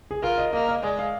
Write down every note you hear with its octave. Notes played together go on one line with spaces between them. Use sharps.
G#4
F4 A#4
D#5
A#3 D#5
D#5
G#3 D5
F5